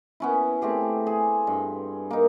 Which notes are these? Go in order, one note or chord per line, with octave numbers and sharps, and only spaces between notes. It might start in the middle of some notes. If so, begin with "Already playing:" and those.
B3 C#4 E4
A3 C4 G4 G#4
G#4
G2
A#3 D#4